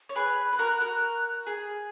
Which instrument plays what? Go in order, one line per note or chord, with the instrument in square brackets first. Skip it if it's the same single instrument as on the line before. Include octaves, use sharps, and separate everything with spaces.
[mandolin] C#5
[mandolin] G#4 B4 [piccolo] F#6
[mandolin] B4
F#4 A#4
F#4 A#4
G#4